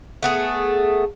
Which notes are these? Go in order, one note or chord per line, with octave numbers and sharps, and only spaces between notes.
A3 B3 G#4